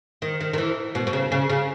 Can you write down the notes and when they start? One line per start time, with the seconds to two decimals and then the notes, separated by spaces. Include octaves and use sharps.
0.22 D#3
0.40 D#3
0.53 D#3
0.58 E3
0.95 B2
1.07 B2
1.13 C#3
1.32 C#3
1.50 C#3